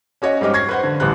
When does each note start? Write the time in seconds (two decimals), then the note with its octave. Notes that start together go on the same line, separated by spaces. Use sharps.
0.22 C#4 F#4 C#5 D#5
0.41 G#2 G3 G4 D#5 F6
0.54 C#6 G#6 A#6 C7
0.69 B4 C5 F#5
0.83 D3
1.00 A1 D2 G3 C6 F#6